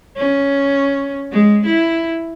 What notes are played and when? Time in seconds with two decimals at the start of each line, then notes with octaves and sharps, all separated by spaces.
0.17 C#4
1.32 G#3
1.66 E4